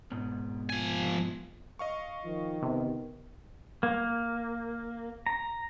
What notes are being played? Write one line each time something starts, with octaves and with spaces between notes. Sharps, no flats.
G#2 B2
F3 G#5
D#5 F5 C#6
D#3 F3
C3 B3
A#3
A#5